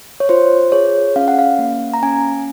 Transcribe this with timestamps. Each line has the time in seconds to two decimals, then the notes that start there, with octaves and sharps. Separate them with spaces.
0.20 C#5
0.29 F4 C5
0.72 G#4 C#5
1.16 C#4 F5
1.28 F#5
1.39 F5
1.59 A#3
1.94 A#5
2.03 C#4 G#5